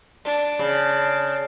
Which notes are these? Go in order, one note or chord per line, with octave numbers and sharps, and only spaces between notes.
D4
C#3